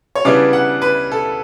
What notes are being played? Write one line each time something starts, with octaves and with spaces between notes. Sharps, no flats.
C#5
C#3 E3 G3 B3 D4 D5
F#5
B4
A4